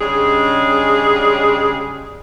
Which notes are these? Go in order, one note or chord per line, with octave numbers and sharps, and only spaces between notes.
C#3 G3 G#3 C#4 D4 G#4